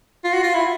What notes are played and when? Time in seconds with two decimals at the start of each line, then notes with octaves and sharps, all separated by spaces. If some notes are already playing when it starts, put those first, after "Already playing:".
0.24 F4
0.33 F#4
0.43 F4
0.54 E4